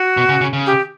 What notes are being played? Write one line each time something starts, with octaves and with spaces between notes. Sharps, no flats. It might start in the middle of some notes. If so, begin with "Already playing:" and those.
Already playing: F#4
B2
C#3
C#3
C#3
G4